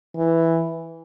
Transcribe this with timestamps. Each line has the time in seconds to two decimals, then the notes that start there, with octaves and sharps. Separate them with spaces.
0.16 E3